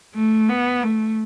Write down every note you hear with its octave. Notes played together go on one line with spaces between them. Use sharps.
A3
B3
A3